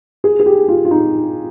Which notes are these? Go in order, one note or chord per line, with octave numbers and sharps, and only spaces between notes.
G#4
G#4
G4
F4
F4
D#4